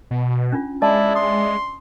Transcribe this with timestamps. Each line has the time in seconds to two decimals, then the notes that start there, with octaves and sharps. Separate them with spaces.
0.11 B2
0.52 C#4 D4 F4
0.82 G#3 E4 D5 E5 A5
1.15 C6 D#6